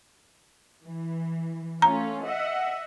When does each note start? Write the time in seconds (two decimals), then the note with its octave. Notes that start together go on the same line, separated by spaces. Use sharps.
0.84 E3
1.82 A3 C#4 F4 A#5
2.25 D#5 E5 F#5